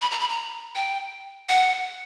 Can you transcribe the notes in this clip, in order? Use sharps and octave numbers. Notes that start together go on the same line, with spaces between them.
B5
A#5
B5
A#5
G5
F#5